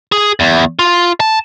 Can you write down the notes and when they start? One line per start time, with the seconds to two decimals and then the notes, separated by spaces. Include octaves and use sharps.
0.12 G#4
0.40 E2
0.79 F4
1.20 A5